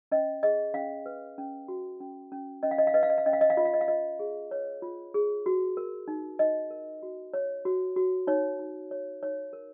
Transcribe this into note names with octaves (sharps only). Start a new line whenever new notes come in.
C#4 D#5
G#4 D#5
C#4 F5
B4
C#4
F#4
C#4
C#4
C#4 D#5
F5
D#5
F5
B4 D#5
F5
D#5
F5
C#4 D#5
F5
D#5
F5
F4 D#5
F5
D#5
F5
F4 D#5
G#4
B4 C#5
F4
G#4
F#4
A#4
D#4
D#4 D#5
A#4
F#4
C#5
F#4
F#4
D#4 C#5
D#4
C#5
D#4 C#5
A#4